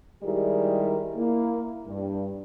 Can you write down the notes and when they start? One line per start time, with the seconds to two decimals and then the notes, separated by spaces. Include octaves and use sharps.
0.24 D#3 G3 G#3 E4 G4 A#4
1.15 A#3 E4
1.87 G2